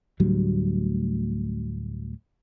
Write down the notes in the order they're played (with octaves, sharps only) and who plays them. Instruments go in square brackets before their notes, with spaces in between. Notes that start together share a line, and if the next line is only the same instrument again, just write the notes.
[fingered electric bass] D2 A2 F#3 G3